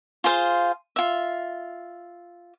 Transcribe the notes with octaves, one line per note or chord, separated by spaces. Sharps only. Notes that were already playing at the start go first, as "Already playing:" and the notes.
F4 G#4 C5 F5
F4 E5